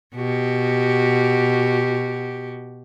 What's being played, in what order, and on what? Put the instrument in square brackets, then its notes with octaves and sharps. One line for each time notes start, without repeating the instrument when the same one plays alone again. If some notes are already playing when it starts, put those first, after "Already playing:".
[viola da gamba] B2 F#4 G4